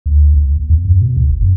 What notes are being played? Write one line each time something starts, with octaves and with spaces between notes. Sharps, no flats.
D2
C#2
D#2
E2
F#2
B2
D2
F#1
F#2